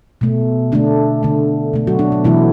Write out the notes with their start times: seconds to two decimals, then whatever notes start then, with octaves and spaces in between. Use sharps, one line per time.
0.21 B2 A3
0.72 D3 A3 D4
1.23 D3 A3
1.73 B2 A3
1.87 F#3 F#4
1.99 D4
2.12 B3
2.24 B2 E3 F#3 A3 E4